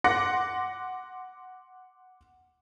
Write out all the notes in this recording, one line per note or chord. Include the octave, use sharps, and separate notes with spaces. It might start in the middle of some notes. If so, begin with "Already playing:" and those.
F#5 C6 D6 F#6 A#6 C#7